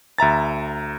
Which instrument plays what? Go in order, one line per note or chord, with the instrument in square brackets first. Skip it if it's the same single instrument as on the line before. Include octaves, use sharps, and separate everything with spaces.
[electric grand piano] D2 E5 A#5 A6